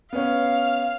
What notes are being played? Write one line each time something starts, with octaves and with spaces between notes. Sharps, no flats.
B3 C#4 F5